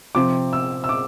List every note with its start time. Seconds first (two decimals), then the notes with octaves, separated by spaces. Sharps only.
0.15 C3 F3 C4 F4 D6
0.53 E6
0.84 E6
0.89 D6